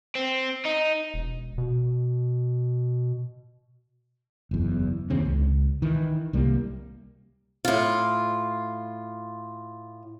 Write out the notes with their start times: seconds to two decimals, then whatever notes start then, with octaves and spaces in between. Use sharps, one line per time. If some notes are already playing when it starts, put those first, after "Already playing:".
0.15 C4
0.65 D#4
1.14 E1
1.58 B2
4.51 F#1 E2
5.10 G1 D#2 C#3 C4
5.25 C#2
5.82 D#3 E3
6.33 C2 G3 A#3
7.65 A2 F4